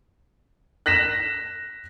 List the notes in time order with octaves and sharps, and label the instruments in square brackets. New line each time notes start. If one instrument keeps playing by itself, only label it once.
[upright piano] F#6 A#6 B6 E7